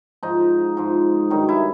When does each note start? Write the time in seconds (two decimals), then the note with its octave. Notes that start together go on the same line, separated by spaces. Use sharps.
0.23 G#2 F3 D#4
0.77 G#2 F3
1.30 G2 D#3 F#3 D#4
1.49 E4